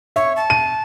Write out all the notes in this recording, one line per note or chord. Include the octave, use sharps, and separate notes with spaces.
C#5 E5
A5
D#7